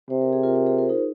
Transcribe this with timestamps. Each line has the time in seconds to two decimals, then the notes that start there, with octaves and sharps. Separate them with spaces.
0.10 C3 C5
0.21 A#4
0.33 G#4
0.43 F4 A#4
0.55 F4 A#4
0.66 G#4 C5
0.78 F4 A#4
0.89 D#4 G#4